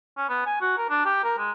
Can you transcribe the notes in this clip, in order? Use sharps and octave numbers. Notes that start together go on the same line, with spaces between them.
C#4
B3
G#5
F#4
A#4
D4
G4
A#4
G#3